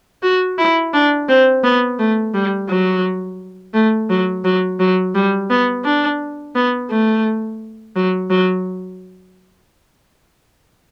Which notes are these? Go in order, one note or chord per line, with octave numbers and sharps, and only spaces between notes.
F#4
E4
D4
C4
B3
A3
G3
F#3
A3
F#3
F#3
F#3
G3
B3
D4
B3
A3
F#3
F#3